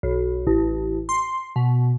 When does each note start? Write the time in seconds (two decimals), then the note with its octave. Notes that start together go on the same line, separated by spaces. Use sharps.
0.03 B1
0.47 A1
1.09 C6
1.56 B2